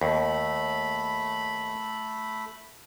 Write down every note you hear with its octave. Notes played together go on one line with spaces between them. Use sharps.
D#2 A3 B5